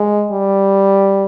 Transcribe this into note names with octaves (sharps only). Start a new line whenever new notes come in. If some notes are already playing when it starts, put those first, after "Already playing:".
Already playing: G#3
G3